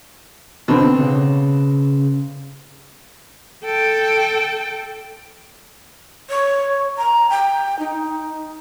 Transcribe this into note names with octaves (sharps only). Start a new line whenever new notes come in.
B2 D3 C4
C#3
A4 G5
C#5
A#5
G5
D#4